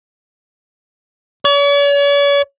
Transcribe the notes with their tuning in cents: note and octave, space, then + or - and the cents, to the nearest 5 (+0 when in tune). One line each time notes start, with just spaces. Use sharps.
C#5 +45